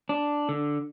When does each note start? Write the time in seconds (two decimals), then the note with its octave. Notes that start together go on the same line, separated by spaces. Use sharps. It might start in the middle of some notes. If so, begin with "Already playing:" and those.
0.09 D4
0.49 D3